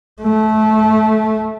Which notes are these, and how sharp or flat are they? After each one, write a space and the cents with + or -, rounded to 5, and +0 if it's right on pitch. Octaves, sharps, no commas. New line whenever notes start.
A3 -20